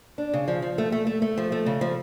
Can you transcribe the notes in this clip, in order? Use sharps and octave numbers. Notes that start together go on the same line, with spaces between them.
D4
C#3
F3
F3
A3
A3
A3
A3
F3
A3
C#3
F3